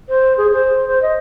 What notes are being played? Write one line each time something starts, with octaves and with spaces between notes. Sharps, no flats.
C5
G#4
C5
C5
D#5